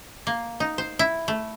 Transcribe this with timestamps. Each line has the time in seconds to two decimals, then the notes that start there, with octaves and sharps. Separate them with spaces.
0.27 A#3
0.60 D#4
0.78 C5
0.99 E4
1.28 A3